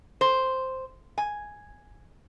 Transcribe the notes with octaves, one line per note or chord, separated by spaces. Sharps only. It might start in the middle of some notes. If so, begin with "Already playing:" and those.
C5
G#5